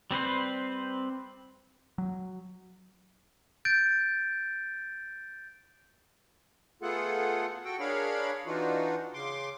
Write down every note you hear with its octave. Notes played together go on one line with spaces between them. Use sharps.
G3 C4 B4 C5
F#3
G6 A6 D7
A3 B3 F4 G#4 A4 F#5
F#4 A4 G5
D4 G#4 A#4 C#5 F5 B5
E3 D4 D#4 F4 F#4
C#3 C6 D6